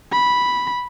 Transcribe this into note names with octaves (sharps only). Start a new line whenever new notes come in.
B5